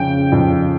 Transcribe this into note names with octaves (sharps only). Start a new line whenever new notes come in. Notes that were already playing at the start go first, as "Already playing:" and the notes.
Already playing: F2 C#3 G5
F2